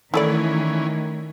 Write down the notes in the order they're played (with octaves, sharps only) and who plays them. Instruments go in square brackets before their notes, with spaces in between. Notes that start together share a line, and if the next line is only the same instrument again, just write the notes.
[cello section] D#3 A3 [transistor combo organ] E3 C#4 [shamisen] E4 A4 D5